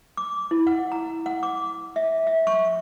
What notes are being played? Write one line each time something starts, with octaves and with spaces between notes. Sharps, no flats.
D6
E4
F#5
A#5
F#5
D6
E5
E5
C#6